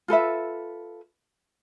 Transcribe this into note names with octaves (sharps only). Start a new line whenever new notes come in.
F4 A4 B4 E5